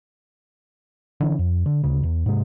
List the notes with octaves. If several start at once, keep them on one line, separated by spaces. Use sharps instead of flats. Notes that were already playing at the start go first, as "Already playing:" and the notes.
D3 E3 C#4
F2
D3
D2 C#3
E2
G#2 C3 G#3